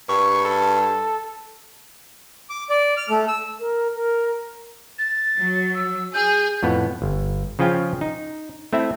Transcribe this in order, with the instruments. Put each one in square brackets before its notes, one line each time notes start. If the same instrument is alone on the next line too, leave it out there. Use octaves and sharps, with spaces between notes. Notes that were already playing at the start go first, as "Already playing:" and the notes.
[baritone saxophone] G2 [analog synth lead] C#6
[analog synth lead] A4
[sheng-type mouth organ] D6
D5
F6
A3
E6
[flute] A#4
A#4
[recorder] A6
[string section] F#3
[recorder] E6
[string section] G#4 [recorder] G6
[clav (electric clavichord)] F2 A2 B3
G1
C#3 F3 C#4 F4 G5
D#4
A3 C4 E4 E5